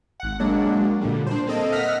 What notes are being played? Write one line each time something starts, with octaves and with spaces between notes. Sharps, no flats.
G#1 F#5
F#3 G#3 A#3 D4
A#2 D3 G3
D4 C5
A#3 C4 A4 D#5
D#5 E5 F#5 F6 A#6 B6